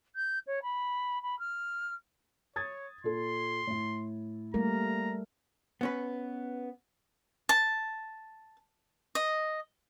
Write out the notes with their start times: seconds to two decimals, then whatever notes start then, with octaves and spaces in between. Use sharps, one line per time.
0.15 G6
0.46 C#5
0.62 B5
1.22 B5
1.39 F6
2.56 C#5 D#6 G#6 A6
3.04 A#2 A4 C6
3.67 A2 E4
4.54 G3 A3 A#3 A#4 A#5
5.81 B3 C#4 B4
7.49 A5
9.15 D#5